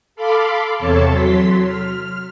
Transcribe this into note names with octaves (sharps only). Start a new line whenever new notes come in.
A4 F5 B5 C6 D6
E2 C3 A4 C#5 A5
F#3 C6 B6
F6